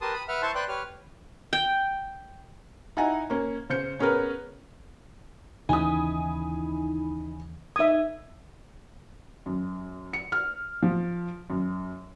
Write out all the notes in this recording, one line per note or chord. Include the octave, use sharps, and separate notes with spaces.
G4 A#4 B4 A5 C6 D#6
B5 D#6
B4 E5 F#5 F6
E4 C5 A5 C6 C#6
B4 C5 D5 G5 C6 F#6
G4 B4 C#5 F6
G5
D#4 E4 E5 F#5 G#5 A#5
A#3 C#4
C#3 C5 G6 C#7
B3 C#4 G#4 A#4 B4
D#2 C#3 E3 D#4 E4 G#5 B5 D#6
D#4 E5 D#6 G#6
F#2
C#7
F6
F3
F#2